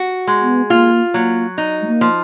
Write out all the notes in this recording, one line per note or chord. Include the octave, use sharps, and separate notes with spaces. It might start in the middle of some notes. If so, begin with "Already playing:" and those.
Already playing: F#4
G#3
B3
A#3 F4
F#3 A#3
D#4
G#3
A#3
F3